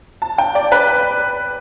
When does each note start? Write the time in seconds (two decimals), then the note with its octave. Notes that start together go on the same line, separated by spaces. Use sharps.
0.22 A5
0.38 G5
0.55 D5
0.72 B4